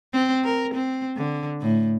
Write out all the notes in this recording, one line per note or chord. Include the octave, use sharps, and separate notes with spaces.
C4
A#4
C4
D3
A2